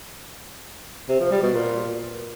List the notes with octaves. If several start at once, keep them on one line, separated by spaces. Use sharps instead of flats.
C3
F3
G3
B2
A#2